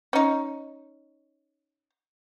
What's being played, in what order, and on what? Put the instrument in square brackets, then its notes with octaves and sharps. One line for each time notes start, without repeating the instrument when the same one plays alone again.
[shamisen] C#4 D#4